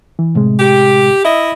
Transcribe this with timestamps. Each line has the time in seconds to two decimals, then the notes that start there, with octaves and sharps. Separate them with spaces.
0.19 E3
0.35 A2 C3 G#3
0.60 G4
1.25 E4 D#5 E5